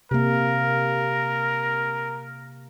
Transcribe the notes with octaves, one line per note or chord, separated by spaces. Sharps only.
C3 A#3 A#4